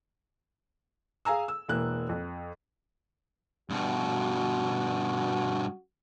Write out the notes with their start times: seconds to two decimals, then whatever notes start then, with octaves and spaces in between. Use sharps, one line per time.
1.25 G#4 F5 G#5 A#5 E6
1.48 E6
1.68 E1 E3 A#3 F#6
2.09 F2
3.70 G2 B2 F#4